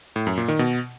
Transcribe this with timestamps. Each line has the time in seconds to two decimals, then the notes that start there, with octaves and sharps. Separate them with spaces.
0.16 A2
0.27 F#2
0.37 A#2
0.48 D#3
0.59 B2